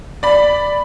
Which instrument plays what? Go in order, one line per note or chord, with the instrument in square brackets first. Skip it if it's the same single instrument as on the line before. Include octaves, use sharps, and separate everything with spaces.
[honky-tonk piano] D5 B5